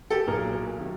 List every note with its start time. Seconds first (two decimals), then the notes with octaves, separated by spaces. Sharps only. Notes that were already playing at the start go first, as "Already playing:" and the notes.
0.10 G4 A4
0.27 B1 A#2 F#3 G#4 A#4
0.78 C3 D#3 F#3